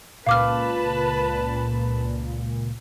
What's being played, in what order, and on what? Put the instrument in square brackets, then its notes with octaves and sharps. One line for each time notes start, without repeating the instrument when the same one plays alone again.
[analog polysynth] C#2 A#2 [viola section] B4 A5 [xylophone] F5 D6 F6